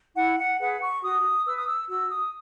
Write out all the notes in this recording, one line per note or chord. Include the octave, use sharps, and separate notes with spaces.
E4 F#5
F#5
G#4 B4 F#5
C#6
F#4 D#6
B4 E6
D#6
E6
F#4 E6
D#6